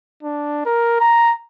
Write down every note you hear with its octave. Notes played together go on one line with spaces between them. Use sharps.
D4
A#4
A#5